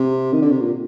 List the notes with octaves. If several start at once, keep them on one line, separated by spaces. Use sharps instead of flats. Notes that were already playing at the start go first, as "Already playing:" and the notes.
Already playing: C3
D#3
D3
C3
A#2